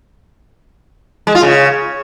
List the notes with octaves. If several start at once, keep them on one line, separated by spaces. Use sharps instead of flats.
G#3
F4
C#3